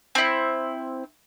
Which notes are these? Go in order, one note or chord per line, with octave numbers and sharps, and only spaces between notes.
C4 E4